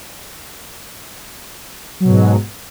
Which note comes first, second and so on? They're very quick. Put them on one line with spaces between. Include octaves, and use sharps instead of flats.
F#3 B2 G#2